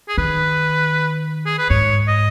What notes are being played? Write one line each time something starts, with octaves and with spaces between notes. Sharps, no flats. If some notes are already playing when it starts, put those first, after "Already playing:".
G#4
D#3 B4
G#4
B4
G#2 C#5
D#5